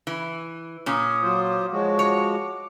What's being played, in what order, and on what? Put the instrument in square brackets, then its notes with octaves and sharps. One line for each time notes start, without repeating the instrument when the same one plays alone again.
[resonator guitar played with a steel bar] E3
[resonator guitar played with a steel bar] A#2 C#4 [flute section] D6 D#6
[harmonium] F#3 F4 C5
[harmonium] F3 G#3 F#4 [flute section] C#5
[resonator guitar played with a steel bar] C#5 [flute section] D6